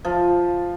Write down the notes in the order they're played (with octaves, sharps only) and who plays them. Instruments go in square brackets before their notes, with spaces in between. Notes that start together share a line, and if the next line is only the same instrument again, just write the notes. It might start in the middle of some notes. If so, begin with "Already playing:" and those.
[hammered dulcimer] F3